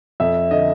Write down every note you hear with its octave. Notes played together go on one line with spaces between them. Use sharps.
F2 E5
D3 D#5